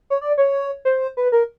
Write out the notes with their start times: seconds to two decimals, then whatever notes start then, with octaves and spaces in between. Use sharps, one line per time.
0.10 C#5
0.21 D5
0.38 C#5
0.85 C5
1.17 B4
1.32 A#4